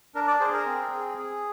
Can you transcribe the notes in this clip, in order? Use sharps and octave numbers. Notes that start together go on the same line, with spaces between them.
D4 A#4
D5
G#4 C5
A#4
C4
G#4
G#4